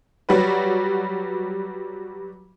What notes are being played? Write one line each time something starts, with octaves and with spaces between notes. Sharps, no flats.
F#3 G3 F#4 B4